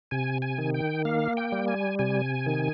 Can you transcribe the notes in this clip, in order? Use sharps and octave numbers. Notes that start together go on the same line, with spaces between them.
C3 G#5
G#5
D#3
G5
A#3 F5
G5
G3
G#5
C3 G#5
D#3